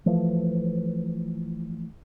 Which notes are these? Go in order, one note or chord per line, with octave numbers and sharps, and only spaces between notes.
E3 F3 A3